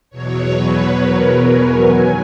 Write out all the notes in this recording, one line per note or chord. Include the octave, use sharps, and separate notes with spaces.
E2 B2 F#3 C#5
B4
A#4
G#5
F#2 D#3 F#3